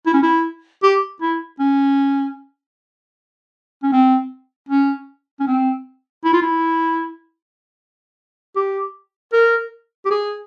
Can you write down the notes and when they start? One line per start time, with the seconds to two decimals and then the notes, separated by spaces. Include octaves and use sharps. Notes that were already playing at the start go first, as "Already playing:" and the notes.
0.06 E4
0.14 C#4
0.23 E4
0.83 G4
1.21 E4
1.60 C#4
3.83 C#4
3.93 C4
4.69 C#4
5.40 C#4
5.47 C4
6.25 E4
6.33 F4
6.42 E4
8.56 G4
9.33 A#4
10.05 G4
10.11 G#4